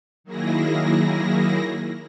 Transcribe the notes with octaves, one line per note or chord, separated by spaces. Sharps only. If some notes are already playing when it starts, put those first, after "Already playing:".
D#3 F#3 A#3 E4 G#4 A#6